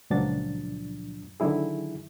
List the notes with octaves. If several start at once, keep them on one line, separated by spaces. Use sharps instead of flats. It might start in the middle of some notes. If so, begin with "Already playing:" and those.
C#2 A#2 F3 F#3 D4 A6
D3 D#3 F#3 E4 G#4